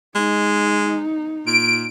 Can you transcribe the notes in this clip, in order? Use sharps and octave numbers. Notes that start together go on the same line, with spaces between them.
G#3 D#4
A#2 D7